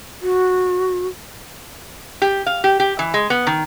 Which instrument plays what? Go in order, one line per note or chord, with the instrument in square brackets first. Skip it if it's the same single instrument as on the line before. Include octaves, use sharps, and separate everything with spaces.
[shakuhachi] F#4
[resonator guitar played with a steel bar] G4
F5
G4
G4
E3
G#3
B3
D#3